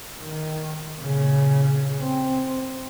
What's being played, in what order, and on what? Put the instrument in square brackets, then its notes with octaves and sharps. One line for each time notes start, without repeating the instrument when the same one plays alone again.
[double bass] D#3
A#2 C#3
C4